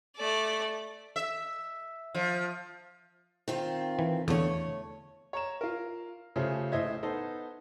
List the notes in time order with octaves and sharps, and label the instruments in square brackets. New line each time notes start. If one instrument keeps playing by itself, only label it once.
[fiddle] A3 D5
[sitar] E5
F3
[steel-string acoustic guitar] D#3 C4 F4
[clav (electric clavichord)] E3
[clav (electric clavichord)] E2 D3 [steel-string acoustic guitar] A3 C#5
[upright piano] C#5 A#5 E7
F4 A#4
C#3 F3 A3 G4 G#4 C5
A#1 A2 C5 D#5 E5 G#6
B3 D#4 A4 C5